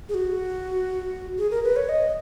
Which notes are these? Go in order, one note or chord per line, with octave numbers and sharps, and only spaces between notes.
G#4
F#4
G#4
A#4
B4
C#5
D#5